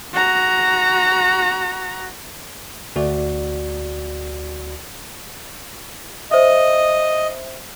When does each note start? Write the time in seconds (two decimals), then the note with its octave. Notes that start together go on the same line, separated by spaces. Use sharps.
0.13 F#4 A#5
2.96 D2 F#4 D5
6.31 C5 D#5 E5